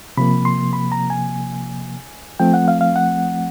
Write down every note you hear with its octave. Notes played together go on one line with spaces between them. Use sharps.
C3 F3 A#3 B5
C6
B5
A#5
G#5
F3 A3 C4 G5
F#5
F5
F5
F#5